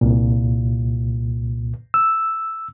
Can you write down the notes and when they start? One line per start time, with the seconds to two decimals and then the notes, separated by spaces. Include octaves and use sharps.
0.01 C2 A#2
1.94 E6